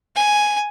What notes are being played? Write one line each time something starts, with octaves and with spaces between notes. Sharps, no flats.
G#5